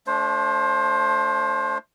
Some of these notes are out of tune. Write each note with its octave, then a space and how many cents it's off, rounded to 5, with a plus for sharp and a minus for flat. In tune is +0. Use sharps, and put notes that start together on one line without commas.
A3 +0 D4 -25 C5 +20